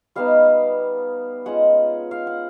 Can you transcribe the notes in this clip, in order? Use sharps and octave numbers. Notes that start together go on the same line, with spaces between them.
G3 B3 D#4 F5
G#3 C#4 F4 F#5
F5
F#5